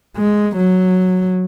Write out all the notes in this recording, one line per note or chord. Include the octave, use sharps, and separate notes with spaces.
G#3
F#3